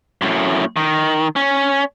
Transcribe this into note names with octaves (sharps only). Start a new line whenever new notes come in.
F#2 A2
D#3
C#4